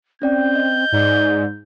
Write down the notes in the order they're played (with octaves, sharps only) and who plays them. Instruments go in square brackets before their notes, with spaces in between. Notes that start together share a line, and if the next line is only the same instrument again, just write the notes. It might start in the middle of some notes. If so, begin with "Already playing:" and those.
[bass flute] C4 [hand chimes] C#4 D5 G5 [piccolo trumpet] G6
[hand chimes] D#5
[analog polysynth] G#2 [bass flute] D5